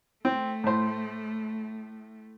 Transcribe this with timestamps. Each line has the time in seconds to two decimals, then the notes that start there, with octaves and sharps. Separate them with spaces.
0.25 A3 C4
0.64 A2 C5